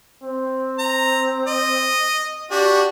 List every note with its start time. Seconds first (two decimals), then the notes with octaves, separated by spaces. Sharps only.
0.23 C4
0.79 A#5
1.47 D#5
2.51 D4 F#4 G4